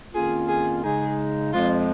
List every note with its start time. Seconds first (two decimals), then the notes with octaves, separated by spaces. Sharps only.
0.14 F2 D#3 A#3 C#4 F4 G#4
0.48 G#4
0.83 C#3 G#3 D#4 G#4
1.53 F2 F3 G#3 F4